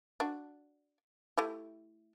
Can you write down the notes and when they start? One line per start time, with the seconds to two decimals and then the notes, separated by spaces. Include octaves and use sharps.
0.20 D4 F#4
1.38 A3 E4 G4